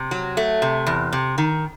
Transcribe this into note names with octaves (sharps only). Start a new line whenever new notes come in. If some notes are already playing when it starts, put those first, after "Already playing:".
Already playing: C3
F#3
A3
C3
E2
C3
D#3